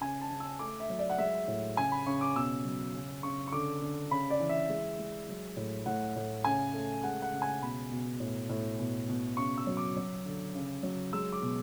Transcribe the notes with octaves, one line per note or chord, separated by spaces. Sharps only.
C#3 G#5
A5
C#3
E6
A3 D6
E5
F#3
D5
F#5
G#3 E5
A2
C#3 G#5
B5
C#3 C#6
D6
B2 E6
F#3
C#3
C#3 C#6
C#6
D3 D6
D3
C#3 B5
D5
E3
E5
G#3
G#3
F#3
A2
A2 F#5
A2
C#3 G#5
A3
G#3 F#5
F#5
C#3
G#5
B2 B5
B2
A2
A2
B2
B2
C#3 C#6
E6
F#3
D6
F#3
D3
C#3
F#3
G#3 E6
D6
B2